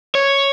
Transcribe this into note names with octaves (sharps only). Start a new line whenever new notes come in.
C#5